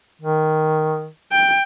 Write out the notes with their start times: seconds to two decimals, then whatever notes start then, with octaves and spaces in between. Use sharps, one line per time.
0.22 D#3
1.32 G5